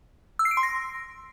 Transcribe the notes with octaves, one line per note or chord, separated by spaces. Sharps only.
E6
C7
D7
C6
A#6